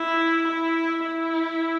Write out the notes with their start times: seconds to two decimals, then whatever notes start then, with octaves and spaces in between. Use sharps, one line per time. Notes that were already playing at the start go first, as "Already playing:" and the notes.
Already playing: E4
0.48 E4
1.03 E4